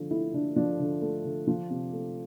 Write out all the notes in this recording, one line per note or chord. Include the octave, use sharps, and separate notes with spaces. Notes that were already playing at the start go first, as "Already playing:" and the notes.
Already playing: D3 F3
A3 E4
D3 D4
F3 D4
D3
A3
D3
F3
C3
A3